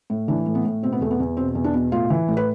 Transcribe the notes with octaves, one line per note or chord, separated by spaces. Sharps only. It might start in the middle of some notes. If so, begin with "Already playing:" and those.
A2
E3 D4
A2
B3
A2
B2 C4
B3
E2 A3
B3
E2
B2 C4
E2
D4
B2
A2 F4
E3
A2
B4